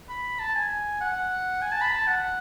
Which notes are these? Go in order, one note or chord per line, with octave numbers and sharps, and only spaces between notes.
B5
A5
G#5
F#5
G#5
A5
B5
A5
F#5